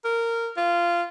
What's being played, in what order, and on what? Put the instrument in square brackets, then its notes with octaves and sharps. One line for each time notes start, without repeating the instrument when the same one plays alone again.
[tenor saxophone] A#4
F4